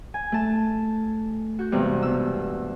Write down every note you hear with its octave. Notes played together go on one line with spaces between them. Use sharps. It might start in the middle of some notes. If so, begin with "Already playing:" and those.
G#5
A3 A4 A5
F#4 G6
E2 G2 C3 G#3
B2 E6